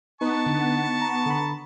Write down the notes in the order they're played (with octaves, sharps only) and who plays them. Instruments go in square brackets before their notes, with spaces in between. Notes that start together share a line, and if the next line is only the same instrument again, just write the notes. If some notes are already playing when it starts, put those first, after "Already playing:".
[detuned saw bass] B3 [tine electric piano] D#4 [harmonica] A5 C#6
[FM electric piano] D3
A#5
[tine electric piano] D3 B5